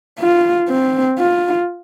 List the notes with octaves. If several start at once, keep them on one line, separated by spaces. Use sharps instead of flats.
F4
C4
F4